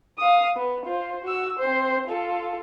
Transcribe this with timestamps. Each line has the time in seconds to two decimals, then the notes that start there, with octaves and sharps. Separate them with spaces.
0.18 F5 D#6
0.56 B3
0.85 F4 C5
1.23 F#4 E6
1.59 C4 C5
2.07 F4 A4